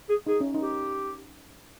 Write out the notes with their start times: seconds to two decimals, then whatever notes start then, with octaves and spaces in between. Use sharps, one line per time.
0.09 G#4
0.27 D#4 G#4
0.41 C#4
0.54 D#4
0.62 G4